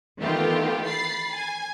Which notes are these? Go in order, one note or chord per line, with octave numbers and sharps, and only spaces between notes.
D#3 E3 A3 B3 F4 G4
B5 A6 C7
G#5